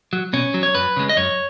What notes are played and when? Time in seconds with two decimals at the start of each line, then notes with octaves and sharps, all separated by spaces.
0.13 F#3
0.33 B2 C#4
0.54 F#3
0.63 C#5
0.75 F#2 B4
0.97 C#3 G#3
1.09 D#5
1.17 F#2 C#5